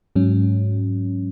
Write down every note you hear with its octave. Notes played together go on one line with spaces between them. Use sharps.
G#2 F#3 C#4